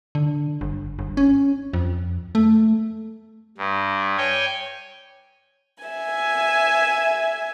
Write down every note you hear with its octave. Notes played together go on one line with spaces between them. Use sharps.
D3
G1
G1
C#4
F2
A3
G2
C#5 G5 G#5
E5 G#5